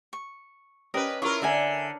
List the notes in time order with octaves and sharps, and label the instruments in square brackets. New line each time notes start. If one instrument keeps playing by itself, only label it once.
[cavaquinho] C#6
[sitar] C#4 B4 [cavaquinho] G4 A#4 D#5
[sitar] E4 F4 A#4 [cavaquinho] C#6 D6
[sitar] D3 [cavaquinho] A#4 E5 G#5